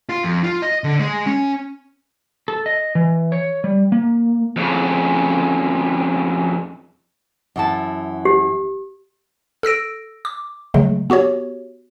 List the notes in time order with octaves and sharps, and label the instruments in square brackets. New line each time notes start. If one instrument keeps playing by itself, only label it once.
[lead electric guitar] F4
F2
F4
D#5
D3
G#3
C#4
[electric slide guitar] A4
D#5
E3
C#5
G3
A#3
[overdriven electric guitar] F2 C#3
[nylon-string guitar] F#2 E3 A5
[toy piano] G4
[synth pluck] A4 E6 A#6 D7
D6
C#3 F#3 G#3 A3
B3 F#4 G4 C#5